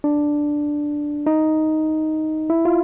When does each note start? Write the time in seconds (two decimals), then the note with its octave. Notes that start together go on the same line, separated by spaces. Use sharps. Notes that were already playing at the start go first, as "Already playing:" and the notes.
0.04 D4
1.27 D#4
2.50 E4
2.65 F4